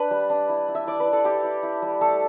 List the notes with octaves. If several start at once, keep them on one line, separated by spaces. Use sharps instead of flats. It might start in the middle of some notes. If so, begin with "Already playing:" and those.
Already playing: D4 B4
G3
D4
E4
E4
E5
E4 D5
B4
E4
A4
E4 G4
E4
E4
G3
A3 A4